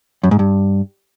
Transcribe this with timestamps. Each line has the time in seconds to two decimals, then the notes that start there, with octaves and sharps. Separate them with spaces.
0.23 F#2
0.31 G#2
0.39 G2